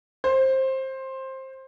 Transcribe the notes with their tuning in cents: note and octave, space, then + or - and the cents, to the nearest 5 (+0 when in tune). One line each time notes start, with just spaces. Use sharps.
C5 +15